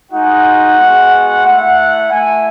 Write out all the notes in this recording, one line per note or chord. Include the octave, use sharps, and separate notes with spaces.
G#3 D#4 F#4 F#5
G#3 B3 F#4
A3 E4 F#5
A3 E4 G#5